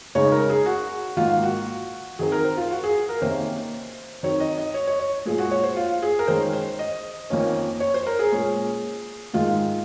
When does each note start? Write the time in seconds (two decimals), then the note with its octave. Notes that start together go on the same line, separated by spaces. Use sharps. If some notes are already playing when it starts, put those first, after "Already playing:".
0.15 C#3 G#3 D#4 C#5
0.32 A#4
0.50 G#4
0.66 F#4
1.17 G#2 D#3 F#3 A#3 F4
1.43 F#4
2.19 D#3 F#3 C4 D#4 G#4
2.32 A#4
2.44 C5
2.57 F4
2.70 F#4
2.83 G#4
3.09 A#4
3.21 C3 D#3 A#3 C#4 C5
4.23 D#3 F#3 C4 D#4 C#5
4.40 D#5
4.58 D#5
4.74 C#5
4.87 C#5
5.00 C#5
5.26 A#2 F3 G#3 G#4
5.38 F#4
5.51 C#5
5.64 C5
5.77 F4
6.02 G#4
6.19 A#4
6.28 D#3 G#3 C#4 C5
6.53 C5
6.79 D#5
7.30 F2 D#3 A#3 C#4
7.80 C#5
7.94 C5
8.06 A#4
8.19 G#4
8.32 A#2 G#3 C#4
9.34 G#2 D#3 G#3 F4